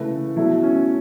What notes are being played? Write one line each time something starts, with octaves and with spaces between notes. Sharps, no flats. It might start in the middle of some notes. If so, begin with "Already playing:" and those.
Already playing: C#3 E3 A3 B4
B2 F#3 A3 E4
C#4